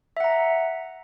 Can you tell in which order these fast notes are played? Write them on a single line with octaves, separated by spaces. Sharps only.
E5 F#5 A#5